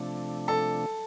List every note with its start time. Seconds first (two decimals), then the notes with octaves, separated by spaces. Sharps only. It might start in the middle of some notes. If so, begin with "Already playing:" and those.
Already playing: C3 F3 A3 D4 A4
0.48 A4